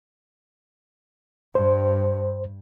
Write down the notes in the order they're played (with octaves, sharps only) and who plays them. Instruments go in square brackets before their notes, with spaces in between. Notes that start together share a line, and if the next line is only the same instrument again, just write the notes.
[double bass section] G2 [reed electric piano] C5